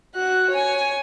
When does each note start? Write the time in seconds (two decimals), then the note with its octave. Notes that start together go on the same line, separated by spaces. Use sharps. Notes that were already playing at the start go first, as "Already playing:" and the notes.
0.15 F#4 F#6
0.50 C#5 G#5